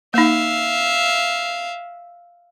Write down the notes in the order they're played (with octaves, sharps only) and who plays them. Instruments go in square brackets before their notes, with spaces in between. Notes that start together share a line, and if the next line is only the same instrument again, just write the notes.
[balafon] A#3 D#4 [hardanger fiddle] E5 F5